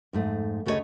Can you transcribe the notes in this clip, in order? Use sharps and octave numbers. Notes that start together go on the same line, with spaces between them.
F2 G#2 A3
D2 C#3 A3 F#4 C#5 D#5